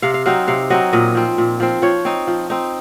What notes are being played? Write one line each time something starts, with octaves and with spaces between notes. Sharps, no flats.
C3 F5
F5
F#3 C4 D#4 F5
C3 F5
F#3 C4 D#4 D#5
A#2 D#5
F3 C4
A#2
F3 C4
F3 C#5
C4 D#4
F3
C4 D#4